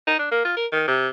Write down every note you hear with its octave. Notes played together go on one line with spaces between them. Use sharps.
D#4
D4
A#3
F4
A#4
D#3
C3